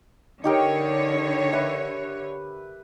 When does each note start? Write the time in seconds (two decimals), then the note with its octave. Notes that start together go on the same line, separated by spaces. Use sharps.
0.44 D3 D#4 G4 A#4 C#5
1.52 B4 E5